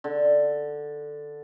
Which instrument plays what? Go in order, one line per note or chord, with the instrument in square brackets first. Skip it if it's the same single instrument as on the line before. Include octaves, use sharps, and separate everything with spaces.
[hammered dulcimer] D3